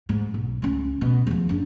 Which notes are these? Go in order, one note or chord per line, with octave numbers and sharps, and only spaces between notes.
G#2
B1
C#2 C#4
B2
E2 F3
F#1 D4